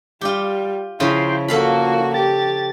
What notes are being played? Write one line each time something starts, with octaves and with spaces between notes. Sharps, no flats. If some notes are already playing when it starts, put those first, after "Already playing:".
G3 F4 G4
C#3 F3 E4 F4 G5 C6
A#3 F4 F#4 A4 F5 B5
G4 A6